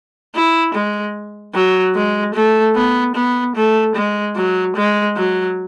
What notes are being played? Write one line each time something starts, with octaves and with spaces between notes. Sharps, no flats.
E4
G#3
F#3
G#3
A3
B3
B3
A3
G#3
F#3
G#3
F#3